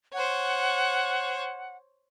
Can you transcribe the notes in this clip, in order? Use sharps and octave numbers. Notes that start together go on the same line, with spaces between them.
C5 C#5 F#5